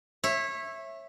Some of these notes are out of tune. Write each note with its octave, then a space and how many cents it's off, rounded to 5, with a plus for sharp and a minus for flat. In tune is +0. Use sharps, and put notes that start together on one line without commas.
C#5 -25 E5 +0